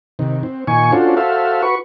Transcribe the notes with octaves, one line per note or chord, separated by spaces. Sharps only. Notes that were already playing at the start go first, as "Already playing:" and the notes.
C3 D#3
C4
A#2 D#3 G#5 C#6
C#4 D4 F4 F#4 A4 C5
F#4 A4 C5 E5 F5
F#4 B4 C#6